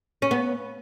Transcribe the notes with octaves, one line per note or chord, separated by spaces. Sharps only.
C#4
B3